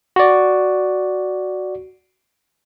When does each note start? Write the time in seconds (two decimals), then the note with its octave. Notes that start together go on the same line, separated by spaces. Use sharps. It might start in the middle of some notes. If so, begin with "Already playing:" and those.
0.16 F#4 D5